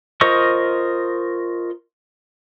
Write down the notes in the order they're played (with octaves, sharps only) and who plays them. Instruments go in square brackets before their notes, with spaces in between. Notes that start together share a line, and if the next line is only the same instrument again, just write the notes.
[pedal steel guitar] F4 A#4 C5 D#5 C#6